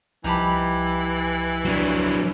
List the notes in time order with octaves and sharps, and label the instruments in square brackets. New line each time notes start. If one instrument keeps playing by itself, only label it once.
[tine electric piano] C2 F3 A5 [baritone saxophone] E3 [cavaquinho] D#4 G4 B5
[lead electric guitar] F#3 D4